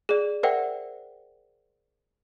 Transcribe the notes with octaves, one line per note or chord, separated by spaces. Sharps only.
G#4 D5
A#4 C5 D5 E5 F#5 G5